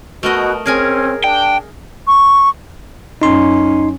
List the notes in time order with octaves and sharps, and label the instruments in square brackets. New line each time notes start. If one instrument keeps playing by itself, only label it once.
[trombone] B2 [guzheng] A3 A#4 D#5 [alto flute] F#4
[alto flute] C4 [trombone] C#4 [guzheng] G#4 A#4 G#5
[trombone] D4 [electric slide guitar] G5 [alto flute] A5
[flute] C#6
[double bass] F#2 C#4 [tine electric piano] D#4 C6